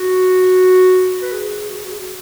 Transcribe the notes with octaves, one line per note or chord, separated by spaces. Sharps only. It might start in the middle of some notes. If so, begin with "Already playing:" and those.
Already playing: F#4
B4
G#4
F#4
G#4
F#4
G#4
F#4